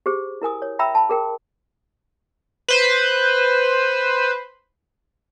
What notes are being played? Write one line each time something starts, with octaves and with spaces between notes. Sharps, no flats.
G4 G#4 C5
E4 A#4 G#5 D#6
C#5
E5 G5 A#5 B5 E6
A5 B5
G#4 A#4 G5
B4 C5